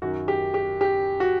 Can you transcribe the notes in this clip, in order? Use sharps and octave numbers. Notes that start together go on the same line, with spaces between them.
F#2 D#3 F#4
G4
G4
G4
F#4